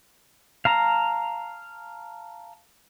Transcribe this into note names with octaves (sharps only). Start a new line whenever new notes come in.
F5 A5 A#5